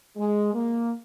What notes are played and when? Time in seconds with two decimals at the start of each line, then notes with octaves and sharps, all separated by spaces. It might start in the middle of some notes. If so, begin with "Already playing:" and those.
0.17 G#3
0.53 A#3